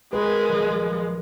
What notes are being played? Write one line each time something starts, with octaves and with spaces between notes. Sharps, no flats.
G#3 G#4 A#4 B4 C6
D#1 F3 F#3